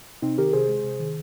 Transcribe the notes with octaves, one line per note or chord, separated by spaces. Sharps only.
C3 C4 D#4
D#3 G4 A#4
C3 G#4 C5
G#3
C3
D#3